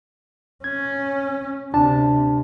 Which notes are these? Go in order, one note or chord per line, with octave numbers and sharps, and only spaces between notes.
C#4 G#6
D2 C3 D4 A5